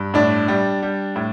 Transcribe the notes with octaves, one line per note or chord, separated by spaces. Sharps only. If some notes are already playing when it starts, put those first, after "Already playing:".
Already playing: G2
A2 D4
G3
G3
A2